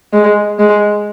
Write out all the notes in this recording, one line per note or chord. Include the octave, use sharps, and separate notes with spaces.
G#3
G#3